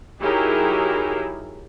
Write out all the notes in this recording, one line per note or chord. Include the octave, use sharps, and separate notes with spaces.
F#3 D#4 E4 G4 G#4 A#4